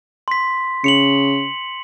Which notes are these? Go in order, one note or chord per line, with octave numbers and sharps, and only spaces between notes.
C6 B6
C#3 C#7 F7 F#7